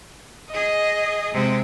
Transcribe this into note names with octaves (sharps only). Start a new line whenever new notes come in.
G#4 D#5
C3 G#3